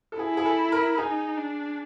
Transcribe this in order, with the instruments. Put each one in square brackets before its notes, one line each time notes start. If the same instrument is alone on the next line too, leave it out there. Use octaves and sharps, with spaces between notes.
[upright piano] A4
[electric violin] E4 [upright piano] G#4
[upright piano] G#4
A4
A#4
[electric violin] D#4 [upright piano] G#4
[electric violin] D4